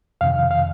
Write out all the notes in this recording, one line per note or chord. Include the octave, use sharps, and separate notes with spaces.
F2 C3 D#3 F5
F5